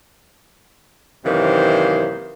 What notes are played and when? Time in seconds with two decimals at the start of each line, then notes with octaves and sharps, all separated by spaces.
1.25 F#2 C3 D#3 E3 A#3 C5